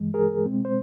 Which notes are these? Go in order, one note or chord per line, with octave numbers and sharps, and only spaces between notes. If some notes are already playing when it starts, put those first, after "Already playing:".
Already playing: G2 E3 G#3
G#4 A#4
B2 G#3 C4
C5